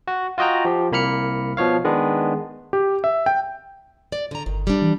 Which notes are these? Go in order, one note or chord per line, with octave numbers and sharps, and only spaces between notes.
F#4
F4 F#4 D#5 G5 A#5
F3 G4
C2 A#3 B5 F6 C#7
B2 F3 C#5 F5
D#3 G#3 B3 D4
G4
E5
G5
D5
D3 A#5
G1 D#3
G3 D4
E3